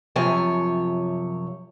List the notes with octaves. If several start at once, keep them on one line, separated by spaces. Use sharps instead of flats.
F#2 C3 F3 C#5 G#5